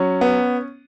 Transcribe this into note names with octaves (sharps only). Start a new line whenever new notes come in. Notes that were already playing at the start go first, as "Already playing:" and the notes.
Already playing: F#3 C#4
B3